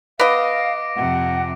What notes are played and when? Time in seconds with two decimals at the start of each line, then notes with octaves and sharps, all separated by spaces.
0.19 B3 D#5 F5 D6 A#6 D7
0.96 F2 C3 F#5